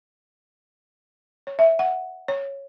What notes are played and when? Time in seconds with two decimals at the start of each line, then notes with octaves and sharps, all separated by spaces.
1.47 C#5
1.59 E5
1.79 F#5
2.28 C#5